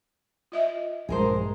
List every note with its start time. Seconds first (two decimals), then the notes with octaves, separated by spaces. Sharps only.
0.52 F4 D#5 E5
1.09 A#1 G2 G#3 G#4 A#4 C5